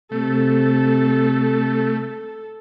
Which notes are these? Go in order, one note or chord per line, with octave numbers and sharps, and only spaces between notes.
C3 A3 A4